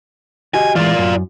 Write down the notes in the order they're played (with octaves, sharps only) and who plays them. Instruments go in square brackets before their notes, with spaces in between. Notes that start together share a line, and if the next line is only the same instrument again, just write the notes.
[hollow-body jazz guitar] F#4 G4 D#5 [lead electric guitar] G#5
[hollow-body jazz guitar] E3 G#3 [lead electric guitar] F4 D5
[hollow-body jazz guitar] F#2